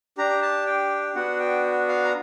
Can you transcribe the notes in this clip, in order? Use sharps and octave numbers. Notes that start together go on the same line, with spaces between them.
D4 G4 A#5
A5
G5
B3 D4 F#4 F#5
G5
F5
A#5